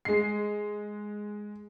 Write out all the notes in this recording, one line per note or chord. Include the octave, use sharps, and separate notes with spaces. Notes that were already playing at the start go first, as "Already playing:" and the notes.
G#3 C7